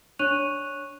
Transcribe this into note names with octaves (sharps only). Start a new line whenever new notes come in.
D4 C#5 C#6 F#6 D#7 F7